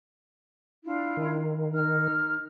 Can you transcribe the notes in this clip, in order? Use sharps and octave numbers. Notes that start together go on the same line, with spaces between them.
D4 E4 F4
D#3
D#4 F6